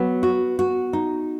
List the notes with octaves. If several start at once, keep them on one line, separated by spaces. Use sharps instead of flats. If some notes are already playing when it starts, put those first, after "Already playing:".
Already playing: F#3 B3
F#4
F#4
D#4